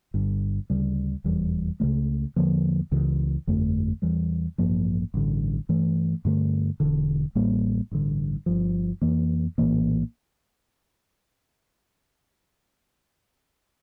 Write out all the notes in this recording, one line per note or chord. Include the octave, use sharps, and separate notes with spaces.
G1 G2 D3
D2 C#3 G3
F1 E2 E3 G3
C#2 C#3 F3 A3
E2 D3 F3 A#3
C#2 C#3 E3
G1 F2 D3 A3
E2 E3 G3
A1 G2 F3 A#3
A1 G2 D3
G2 E3 A3
G2 D3 A3
E1 E2 D3
A1 A2 G3 A#3
A1 G2 D3
G1 G2 F3
F2 E3 A#3
A#1 A2 E3 A#3